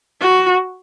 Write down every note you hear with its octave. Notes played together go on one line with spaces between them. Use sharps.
F#4